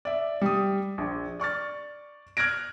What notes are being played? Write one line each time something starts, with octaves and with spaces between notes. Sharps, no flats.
D5 E5
G3 D#6
A#1
D5 C#6 F6 A6
F6 F#6 G#6 A#6 D7